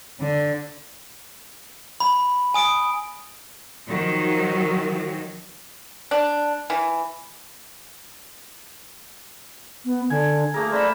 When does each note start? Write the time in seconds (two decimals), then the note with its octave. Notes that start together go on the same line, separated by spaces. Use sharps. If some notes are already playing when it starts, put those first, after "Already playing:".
0.20 D3
2.00 B5
2.54 G#5 D#6 D7
3.88 D#3 F3 F#3
6.11 D4
6.70 E3
9.85 B3
10.10 D3 G#5
10.54 A3 A#3 G#4 A#4
10.72 C5 D5 E5 B5